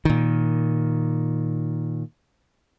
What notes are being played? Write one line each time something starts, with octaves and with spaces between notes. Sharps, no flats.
A#2 D#3